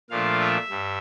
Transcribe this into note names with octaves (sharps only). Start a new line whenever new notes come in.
A#2 F3 A3 D4 F4 F5
E5
G2